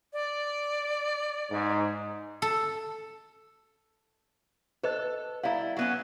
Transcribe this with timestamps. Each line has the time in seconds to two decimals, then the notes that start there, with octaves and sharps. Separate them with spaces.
0.13 D5
1.51 G#2
2.42 A4
4.83 A4 B4 C5 D#5
5.43 G3 E4 F5 A#5
5.77 F#3 B3 C#4